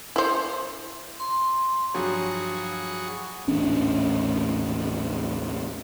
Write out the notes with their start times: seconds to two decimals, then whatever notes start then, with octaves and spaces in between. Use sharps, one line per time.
0.16 E4 C5
1.20 C6
1.94 G2 F3 F#3 F#4 G#4
3.47 D#1 A1 C#4 D4